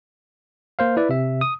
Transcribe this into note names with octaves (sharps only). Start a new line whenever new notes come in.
A#3 C5 F5
E4 B4 D5
C3 E5
D#6